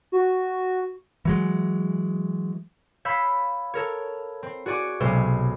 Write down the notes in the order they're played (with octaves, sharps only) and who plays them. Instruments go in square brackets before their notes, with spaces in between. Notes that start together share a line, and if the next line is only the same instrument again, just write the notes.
[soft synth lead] F#4
[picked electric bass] E3 F#3 G#3
[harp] C#5 F5 B5 E6 G6 B6
A4 A#4 C#5
C4
F#4 G#4 D5 C#6
B1 C3 G#3 C#4 A4 C5